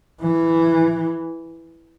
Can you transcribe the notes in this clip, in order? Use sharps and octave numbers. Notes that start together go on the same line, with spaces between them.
E3